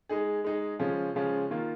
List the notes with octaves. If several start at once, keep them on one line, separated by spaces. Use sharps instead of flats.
G#3 D#4 G#4
G#3 D#4 G#4
C#3 F3 G#3 C#4 F4
C#3 F3 G#3 C#4 F4
D#3 A#3 F4